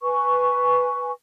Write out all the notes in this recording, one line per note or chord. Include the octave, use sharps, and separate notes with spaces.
B4 G#5 C#6